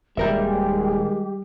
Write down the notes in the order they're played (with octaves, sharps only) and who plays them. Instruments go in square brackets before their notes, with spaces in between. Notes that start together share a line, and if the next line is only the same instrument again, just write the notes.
[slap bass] D#1 A#2 [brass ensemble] D#3 G#3 [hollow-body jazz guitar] G3 A#4 E5 [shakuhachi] G4